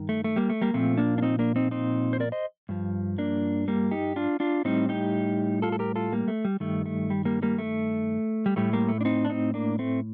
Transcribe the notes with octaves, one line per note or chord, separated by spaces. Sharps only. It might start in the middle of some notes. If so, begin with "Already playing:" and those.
Already playing: G2 D#3
A3
A3
G3 A#3
A3
G3 A#3
A#2 F3 A3 C4
A#3 D4
D4
C4 D#4
A#3 D4
C4 D#4
C4 D#4
C5
A#4 D5
C5 D#5
G2 F3
A#3 D4
G3 A#3
D#4 G4
D4 F4
D4 F4
A2 G3 C4 D#4
D#4 G4
F4 A4
A4
G4 A#4
F4 A4
G3 A#3
A3
G3
G2 D#3 G3 A3
A3
G3
G3 A#3
G3 A#3
A3
G3
A2 G3 A3
G3 A#3
A3
D4
C4 D#4
D4
C4 D#4
A#3 D4
A3 C4